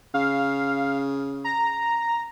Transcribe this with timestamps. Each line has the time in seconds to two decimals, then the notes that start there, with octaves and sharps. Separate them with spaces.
0.14 C#3 F5
1.44 A#5